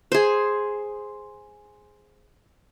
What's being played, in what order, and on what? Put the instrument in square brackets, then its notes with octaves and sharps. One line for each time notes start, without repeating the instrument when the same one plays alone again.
[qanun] G#4 C5